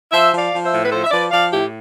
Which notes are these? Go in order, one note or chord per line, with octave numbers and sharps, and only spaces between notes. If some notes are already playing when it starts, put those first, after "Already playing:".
F3 C5 E5
F3
D5 F5
F3
C5 E5
A2
B4
F3 A4 C5
E5
F3 B4 D5
F3 D5 F5
A2 E4 G4